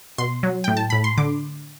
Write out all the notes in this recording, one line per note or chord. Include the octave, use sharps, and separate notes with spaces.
B2 C6
F#3
A2 G5
A5
A2 B5
C6
D3 D6